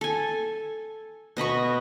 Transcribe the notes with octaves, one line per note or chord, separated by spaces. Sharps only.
A4 G#5
B2 D#5 B5 C#6